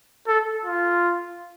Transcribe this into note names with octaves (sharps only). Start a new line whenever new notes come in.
A4
F4